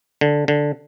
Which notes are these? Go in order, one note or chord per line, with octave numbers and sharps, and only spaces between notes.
D3
D3